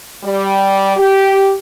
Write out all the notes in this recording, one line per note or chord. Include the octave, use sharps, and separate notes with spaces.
G3
G4